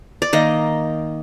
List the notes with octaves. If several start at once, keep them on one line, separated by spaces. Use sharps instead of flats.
D5
D#3 A#3 D#5